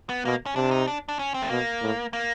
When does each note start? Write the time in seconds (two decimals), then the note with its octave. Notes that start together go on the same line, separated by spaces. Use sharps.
0.09 B3
0.25 B2 A#3
0.46 C#4
0.56 C3 D4
0.71 D#4
0.87 D4
1.09 D4
1.19 C#4
1.34 C4
1.42 A3
1.50 B2 A#3
1.82 A2
2.13 A#3